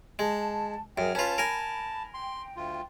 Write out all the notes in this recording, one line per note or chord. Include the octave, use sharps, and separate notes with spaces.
G#3 A5
F#2 G#4 A#4 G5 F6
C#4 F4 B4 A5
A#4 G#5 B5
G5 C6
D2 F4